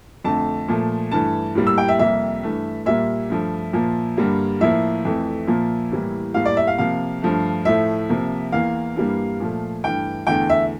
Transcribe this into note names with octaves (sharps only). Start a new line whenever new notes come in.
F2 D3 A3 A5
A#2 F3 A3
G2 E3 A3 A5
A2 G3 A#3
E6
G5
E5
F2 C3 G3 A#3 E5
G2 E3 A3
A#2 G3 A#3 E5
G2 F3 A3
A#2 F3 A#3
G2 D3 G3 A#3
A2 F3 A#3 E5
F2 E3 A3
A#2 F3 A#3
A2 E3 G3 A#3
A2 G3 A#3 F5
D5
E5
F5
C3 F3 A#3 F5
G2 F3 A3
A2 F3 A3 E5
C3 F3 A#3
E2 E3 A#3 F5
G2 E3 G3 A#3
A#2 F3 A3
G2 E3 A3 G5
E2 D3 A3 G5
E5